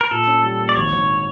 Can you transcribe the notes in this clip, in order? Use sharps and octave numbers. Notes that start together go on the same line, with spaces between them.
A#4
A#2 A4
C#4
G3
A#3
D5
G#1 C#5
G#1